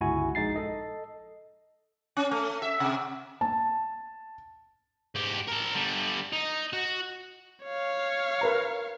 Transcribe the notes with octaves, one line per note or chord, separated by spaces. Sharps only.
G1 C#2 E4 F#4 G#5
A#1 G#3 D#4 A6 C7
A4 D#5
C#4
A3
E5
C3
A5
G#2 G4
A#4 A5
D3 G3
D#4
F#4
C#5 F5
A#4 B4 A#5